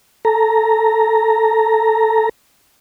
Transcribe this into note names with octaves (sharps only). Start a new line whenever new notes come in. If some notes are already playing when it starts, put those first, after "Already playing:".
A4 A#5